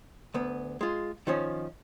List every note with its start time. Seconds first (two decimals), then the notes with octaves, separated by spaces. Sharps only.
0.34 D2 B3
0.81 G#3 F4
1.27 D#3 F3 C#4